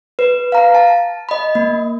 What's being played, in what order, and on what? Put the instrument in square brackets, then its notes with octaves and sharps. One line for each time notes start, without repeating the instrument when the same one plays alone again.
[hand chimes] B4
F5 A#5
A5
D#5 B5
A#3